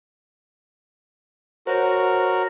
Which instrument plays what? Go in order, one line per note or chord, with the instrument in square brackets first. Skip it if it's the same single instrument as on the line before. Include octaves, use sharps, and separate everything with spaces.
[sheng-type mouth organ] F#4 A#4 [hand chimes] C5 C#5